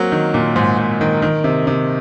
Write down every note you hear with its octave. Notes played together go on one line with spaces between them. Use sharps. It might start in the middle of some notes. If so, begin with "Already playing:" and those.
Already playing: F#3 A#3 C4
D#3
A#2
G#2
G#2
D#3
D#3
C3
C3